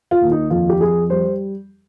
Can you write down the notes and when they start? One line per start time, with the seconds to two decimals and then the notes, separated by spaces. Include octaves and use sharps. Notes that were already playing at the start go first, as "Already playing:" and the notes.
0.11 F4
0.21 D#2
0.31 D#4
0.50 F2 F4
0.69 G4
0.80 F2 G#4
1.10 G3 C5